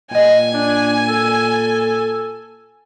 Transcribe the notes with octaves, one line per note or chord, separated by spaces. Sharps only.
A#2 D#5 G5 G#5
D4
A4